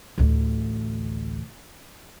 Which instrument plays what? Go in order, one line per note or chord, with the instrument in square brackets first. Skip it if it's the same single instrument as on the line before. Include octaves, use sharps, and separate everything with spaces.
[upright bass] A1 D2